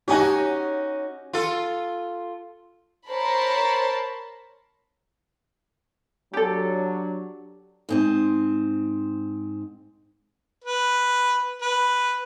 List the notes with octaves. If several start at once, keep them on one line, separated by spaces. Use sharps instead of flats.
C#4 D#4 F#4 G4 G#5
F4 A4
A#4 C5 C#5 A5 B5
F#3 D4 G4 A4
G#2 C4 D#5
B4
B4